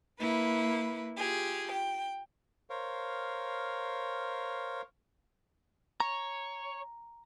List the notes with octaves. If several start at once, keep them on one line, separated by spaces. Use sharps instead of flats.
A#3 E4 B4
F4 G4 G#4
G5
A#4 C5 C#5 F5
C#5 A#5